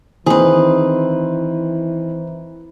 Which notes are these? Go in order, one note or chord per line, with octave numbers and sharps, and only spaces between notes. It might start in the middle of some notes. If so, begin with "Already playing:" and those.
D#3 E3 C4 G#4 B4 C5